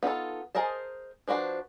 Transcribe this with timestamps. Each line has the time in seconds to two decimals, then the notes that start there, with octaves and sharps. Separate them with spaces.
0.03 B3 D#4 F4 A4
0.55 G#4 A#4 C5 D#5 A5
1.28 F3 D4 F#4 B4 C5